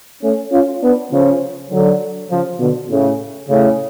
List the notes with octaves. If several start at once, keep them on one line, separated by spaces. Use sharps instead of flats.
A3 C#4
C#4 F4
B3 D4
C#3 F3
D3 F#3
C#3 F3
B2 D3
A2 C#3
A2 C#3